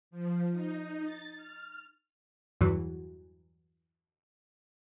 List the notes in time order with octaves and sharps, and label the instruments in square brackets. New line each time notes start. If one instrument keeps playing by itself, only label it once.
[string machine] F3
D#4
A6
F6
[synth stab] E2 G2 E3 F#3